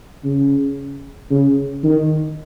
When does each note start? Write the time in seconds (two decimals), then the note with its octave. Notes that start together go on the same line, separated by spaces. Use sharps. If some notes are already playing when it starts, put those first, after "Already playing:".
0.24 C#3
1.30 C#3
1.83 D#3